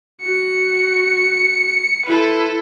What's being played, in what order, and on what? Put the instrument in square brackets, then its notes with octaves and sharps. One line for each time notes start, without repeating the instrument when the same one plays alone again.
[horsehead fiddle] F#4 [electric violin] C#7
[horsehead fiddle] E4 A4 [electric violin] B4 C5